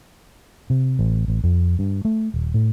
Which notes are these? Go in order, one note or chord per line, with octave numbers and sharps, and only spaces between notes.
C3
A1
A1
F2
G2
A3
D#1
A2